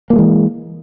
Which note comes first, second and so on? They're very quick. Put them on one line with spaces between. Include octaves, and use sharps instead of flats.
A#3 F3 G#3 E3